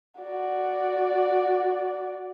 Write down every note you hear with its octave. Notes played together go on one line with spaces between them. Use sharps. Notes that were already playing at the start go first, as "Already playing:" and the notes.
F#4 D5